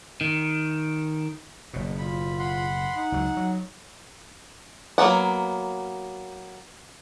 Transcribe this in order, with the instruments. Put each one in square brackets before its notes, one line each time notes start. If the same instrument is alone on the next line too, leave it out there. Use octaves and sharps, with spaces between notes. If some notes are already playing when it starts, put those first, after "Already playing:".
[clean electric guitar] D#3
[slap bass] F#1 B2
[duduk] F4 [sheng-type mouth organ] B5
[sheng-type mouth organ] F#5 B5 C6
[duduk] D#4 [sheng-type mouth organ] F#5
[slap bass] C#2 F#3
F#3
[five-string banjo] F#3 A#3 B3 F#5